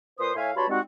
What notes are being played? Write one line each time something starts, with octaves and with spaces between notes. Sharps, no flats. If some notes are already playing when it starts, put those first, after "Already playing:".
A#2 B4 C5 C6 D#6
A2 C#5 E5 F5 G#5
G2 F#4 C#5 A5 B5 C6
G3 G#3 C4 D#4 F#4